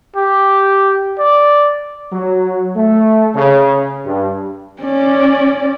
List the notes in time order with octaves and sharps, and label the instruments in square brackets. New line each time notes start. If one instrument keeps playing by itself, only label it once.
[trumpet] G4
D5
[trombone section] F#3
A3
C#3
G2
[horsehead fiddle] C#4 D5